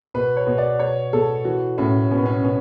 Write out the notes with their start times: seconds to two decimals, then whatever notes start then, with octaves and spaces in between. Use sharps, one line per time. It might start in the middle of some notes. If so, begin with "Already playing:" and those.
0.14 B2 B4
0.37 C#5
0.47 B2
0.58 D5
0.79 B2 C#5
1.13 B2 A4
1.45 E3 F#4
1.78 A2 C#4
2.11 B2 C#4
2.18 B3
2.26 C#4
2.44 B2 C#4